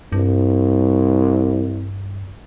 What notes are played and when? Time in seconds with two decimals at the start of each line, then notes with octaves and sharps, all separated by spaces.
0.12 C2 G2